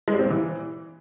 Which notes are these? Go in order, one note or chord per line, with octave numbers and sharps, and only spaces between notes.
G#3
G3
C4
A#2
E3